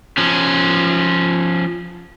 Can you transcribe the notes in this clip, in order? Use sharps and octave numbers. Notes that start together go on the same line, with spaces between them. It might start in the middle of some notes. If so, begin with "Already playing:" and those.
F3 C#4